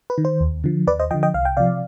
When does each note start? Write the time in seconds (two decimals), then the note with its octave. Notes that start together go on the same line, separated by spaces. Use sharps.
0.10 B4
0.18 D#3
0.25 C5
0.40 D#2
0.64 D3 F3
0.87 D#2 B4 D5
1.00 C5 D#5
1.11 F3 D#5 G5
1.14 D3
1.23 D#5 G5
1.34 C2 F5
1.45 G5
1.57 C3 F3 D5 F5